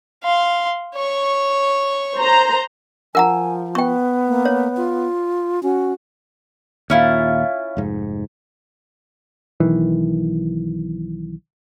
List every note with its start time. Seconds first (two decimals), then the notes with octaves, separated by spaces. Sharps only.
0.24 F5 C6
0.95 C#5 C#6
2.18 C5 A#5
3.15 F3 A#4 F#5 G#5 A#5
3.75 B3 G5 C#6
4.28 A#3
4.45 C#5
4.77 F4
5.63 C#4 F#4
6.90 D#2 A#2 C#4 E4 F4
7.77 F1 G#2
9.60 B1 D#3 E3